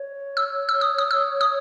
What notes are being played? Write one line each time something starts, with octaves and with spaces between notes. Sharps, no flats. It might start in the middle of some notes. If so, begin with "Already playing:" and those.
Already playing: C#5
E6
E6
D#6
D#6
E6
D#6